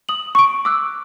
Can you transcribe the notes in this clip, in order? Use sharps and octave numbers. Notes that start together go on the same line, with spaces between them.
D#6 F#7
C#6 D7
D6 E6 F#6